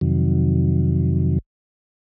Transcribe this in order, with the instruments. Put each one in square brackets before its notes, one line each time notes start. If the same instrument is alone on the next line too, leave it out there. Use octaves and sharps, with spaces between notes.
[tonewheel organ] F2 C3 D#3 F#3